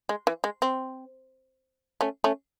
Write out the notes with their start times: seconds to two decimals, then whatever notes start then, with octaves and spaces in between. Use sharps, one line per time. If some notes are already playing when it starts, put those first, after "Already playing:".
0.09 G#3
0.27 E3
0.44 G#3
0.62 C4
2.01 A3 C#4
2.24 A3 C#4